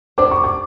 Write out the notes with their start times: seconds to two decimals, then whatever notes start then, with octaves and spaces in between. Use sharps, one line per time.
0.18 D4 G4 C5 D6
0.31 C#6
0.44 D6